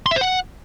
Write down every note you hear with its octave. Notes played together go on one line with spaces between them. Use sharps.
C6
E5
C5
F#5